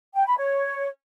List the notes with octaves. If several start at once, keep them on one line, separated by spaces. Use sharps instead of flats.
G5
B5
C#5